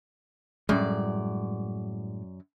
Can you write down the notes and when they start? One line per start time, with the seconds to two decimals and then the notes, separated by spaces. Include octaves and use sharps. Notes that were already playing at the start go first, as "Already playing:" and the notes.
0.69 F#2 A2 G3 G#3 D5